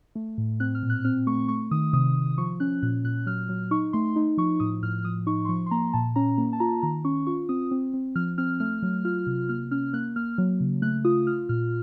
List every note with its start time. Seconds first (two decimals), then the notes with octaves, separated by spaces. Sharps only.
0.15 A3
0.38 A2
0.60 C4 F#6
0.75 F6
0.83 A#2
0.90 F#6
1.05 C4 F6
1.27 A3 C#6
1.48 A3 C#6
1.71 D#3 D#6
1.93 C3 D#6
2.15 C3
2.38 F3 C#6
2.60 C#4 F#6
2.83 A#2 F#6
3.04 A#2 F#6
3.26 F#3 F6
3.49 F#3
3.71 D#4 C#6
3.93 A3 C6
4.16 D#4
4.37 F3 C#6
4.60 A2 D#6
4.82 A2 F6
5.05 F3 D#6
5.27 D#4 C#6
5.45 C6
5.49 F3 C#6
5.66 C6
5.71 A#3 A#5
5.93 A#2 A5
6.16 C#4 A#5
6.38 A#3
6.53 A5
6.60 F4 A#5
6.83 D#3 A#5
7.05 C#4 C#6
7.27 F4 C#6
7.49 C4 D#6
7.71 C4
7.94 C4
8.16 F3 F6
8.38 C4 F6
8.60 A3 F6
8.83 F#3
9.05 F4 F6
9.27 C3
9.49 A#3 F6
9.71 C#4 F6
9.93 A#3 F#6
10.16 A#3 F6
10.38 F#3
10.60 C#3
10.82 A3 F#6
11.05 F4 D#6
11.27 F4 F6
11.49 A#2 F6